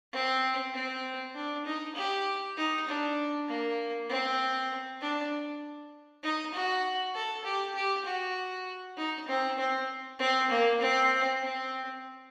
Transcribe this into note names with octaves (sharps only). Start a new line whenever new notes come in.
C4
C4
D4
D#4
G4
D#4
D4
A#3
C4
D4
D#4
F#4
A4
G4
G4
F#4
D#4
C4
C4
C4
A#3
C4
C4